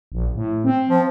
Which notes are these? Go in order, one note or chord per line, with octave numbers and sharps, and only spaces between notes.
A#1
A2
C4
F3